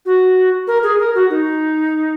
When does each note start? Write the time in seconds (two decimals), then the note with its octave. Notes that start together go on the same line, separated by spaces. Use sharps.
0.06 F#4
0.68 A#4
0.83 G#4
0.99 A#4
1.15 F#4
1.30 D#4